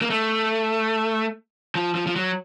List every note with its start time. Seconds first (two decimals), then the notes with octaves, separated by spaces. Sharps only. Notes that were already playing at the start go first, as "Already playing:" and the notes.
0.02 A#3
0.10 A3
1.75 F3
1.95 F3
2.07 F3
2.16 F#3